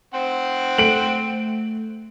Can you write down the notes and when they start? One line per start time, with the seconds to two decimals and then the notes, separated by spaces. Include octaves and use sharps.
0.14 C4 C5 F#5
0.78 A3 D7 F#7